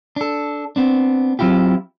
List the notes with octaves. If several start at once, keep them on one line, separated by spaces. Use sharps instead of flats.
D4 A4
B3 C4 D4
F#3 C4 E4 F4 G4